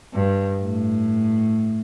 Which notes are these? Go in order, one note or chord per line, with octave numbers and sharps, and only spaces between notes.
G2
A2